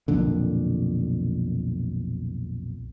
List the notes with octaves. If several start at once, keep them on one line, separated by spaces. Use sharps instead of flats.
B1 F2 A#2 D3